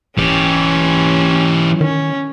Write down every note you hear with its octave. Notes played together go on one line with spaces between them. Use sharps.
D#1 E3 C#4 G4
D#3 C#4